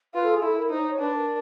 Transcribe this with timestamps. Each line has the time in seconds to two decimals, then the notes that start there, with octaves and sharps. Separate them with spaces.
0.14 F4 B4
0.23 A4
0.33 G#4
0.42 E4 A4
0.56 A#4
0.70 D#4 C5
0.79 D5
0.90 C#5
0.99 D4 B4
1.13 A#4